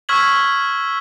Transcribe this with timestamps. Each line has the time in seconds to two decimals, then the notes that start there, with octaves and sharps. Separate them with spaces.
0.09 C#6 E6 F6 G#6 B6 F#7